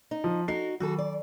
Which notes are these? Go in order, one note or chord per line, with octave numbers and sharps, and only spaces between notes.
D#4
F3
D#4 F#4 A4 C7
D#3 F#3 F#4 G#4 A4
D5